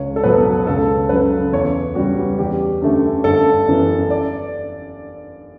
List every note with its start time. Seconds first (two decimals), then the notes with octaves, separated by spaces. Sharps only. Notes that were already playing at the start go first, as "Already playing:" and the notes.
Already playing: C#2 C#5
0.16 A4
0.23 B2 F#3 B3 B4
0.67 C#2 A4
1.09 C#3 F#3 C#4 B4
1.53 E2 C#5
1.95 C#3 G3 B3 F#4
2.39 E2 G4
2.82 D3 A3 C#4
3.24 G1 A4
3.68 F#2 E3 B3
4.10 D5